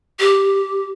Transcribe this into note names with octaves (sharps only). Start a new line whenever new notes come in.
G4